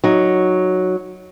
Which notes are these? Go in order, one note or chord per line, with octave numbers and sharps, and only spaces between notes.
F#3 D#4